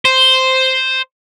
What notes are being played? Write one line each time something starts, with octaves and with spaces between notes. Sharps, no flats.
C5